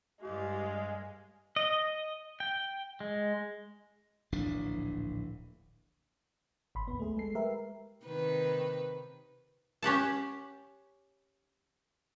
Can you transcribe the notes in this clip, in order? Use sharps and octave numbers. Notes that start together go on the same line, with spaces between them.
G2 G#3 G4 F5
D#5
G5
G#3
D1 A#1 E3 D4
G#1 B5 C6
D2 B3
A3 G#4
G#3 A4 C7
G#3 G4 A#4 B4 E5
C3 D#3 B4
C#4 G4 F#5 A5